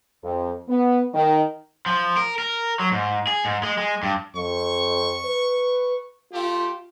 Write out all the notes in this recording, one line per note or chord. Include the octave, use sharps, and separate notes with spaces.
F2
B3
D#3
F3
A#4
A#4
F#3
G#2
G#4
G#2
G#3
G#3
G2
F2 C#6
B4
A3 F4 G4